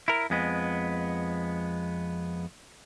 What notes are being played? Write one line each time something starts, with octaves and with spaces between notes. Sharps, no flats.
E4 A#4
F2 G#3 B3